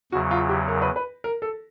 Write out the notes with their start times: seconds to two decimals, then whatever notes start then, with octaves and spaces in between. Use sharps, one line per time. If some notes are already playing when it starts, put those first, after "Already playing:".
0.12 E2 C#3 F#3 F#4
0.31 F4
0.49 G4
0.68 A#4
0.82 B4
0.96 B4
1.24 A#4
1.42 A4